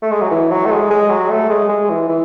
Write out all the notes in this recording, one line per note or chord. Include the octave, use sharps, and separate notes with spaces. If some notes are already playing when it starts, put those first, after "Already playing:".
A3
G#3
F#3
E3
F#3
A3
G#3
G#3
F#3
A3
G#3
G#3
E3
E3